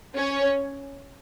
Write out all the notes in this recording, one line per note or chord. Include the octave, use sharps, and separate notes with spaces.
C#4 C#5